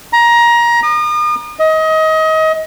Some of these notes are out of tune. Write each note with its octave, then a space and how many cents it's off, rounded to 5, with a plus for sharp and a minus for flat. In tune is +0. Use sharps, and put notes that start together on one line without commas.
A#5 +20
D#6 -40
D#5 +25